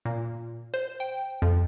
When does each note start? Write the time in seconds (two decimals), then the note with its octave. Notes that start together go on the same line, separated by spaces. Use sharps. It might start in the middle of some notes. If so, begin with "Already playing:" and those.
0.05 A#2
0.74 C5
1.00 G5
1.42 F2